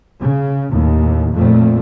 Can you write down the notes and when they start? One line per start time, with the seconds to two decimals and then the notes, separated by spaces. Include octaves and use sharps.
0.19 C#3
0.71 D#2 A2
1.36 F2 A#2 A3